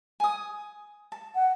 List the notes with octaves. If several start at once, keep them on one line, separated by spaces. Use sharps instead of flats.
G#5 D#6
A5
F#5